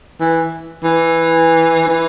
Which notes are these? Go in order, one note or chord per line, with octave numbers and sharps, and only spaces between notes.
E3
E3
E3